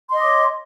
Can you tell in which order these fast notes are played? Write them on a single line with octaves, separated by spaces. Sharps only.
C6 D#5 D6 C#5